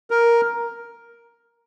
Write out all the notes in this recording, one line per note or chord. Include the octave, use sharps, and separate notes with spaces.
A#4